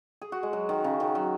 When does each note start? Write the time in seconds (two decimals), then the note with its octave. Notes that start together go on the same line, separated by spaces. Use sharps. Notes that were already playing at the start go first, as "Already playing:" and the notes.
0.22 G#4
0.32 F#4
0.43 G#3
0.53 F#3
0.69 D#3
0.84 C#3
1.00 D#3
1.15 F#3